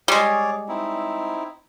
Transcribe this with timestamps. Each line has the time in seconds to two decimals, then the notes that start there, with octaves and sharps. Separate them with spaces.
0.08 G3 G#3 G#4 C#5 D5
0.68 C4 D#4 E4